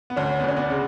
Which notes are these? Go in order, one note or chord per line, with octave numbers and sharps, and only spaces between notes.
B3
D2 C#4
B3
D2 C#4
B3 D4
C#3